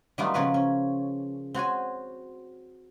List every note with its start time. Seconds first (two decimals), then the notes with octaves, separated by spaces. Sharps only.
0.18 D#3 F#3 G3 A3 B3 F4
0.34 C#3 F3 C#4 F4 A#4 B4
0.54 C#4
1.54 C4 F#4 C#5 G#5